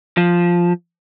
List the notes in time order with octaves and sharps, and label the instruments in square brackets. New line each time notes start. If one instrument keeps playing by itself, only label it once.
[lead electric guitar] F3